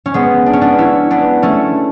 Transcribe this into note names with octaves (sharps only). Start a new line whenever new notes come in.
C#4
G#3 B3
D4
C#4
B3 D4
C#4 E4
B3 D4
A3 C#4